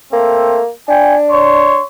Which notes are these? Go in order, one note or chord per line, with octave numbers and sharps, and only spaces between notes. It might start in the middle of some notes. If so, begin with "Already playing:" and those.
A3 A#3 C4
D4 G5 G#5
C#5 C6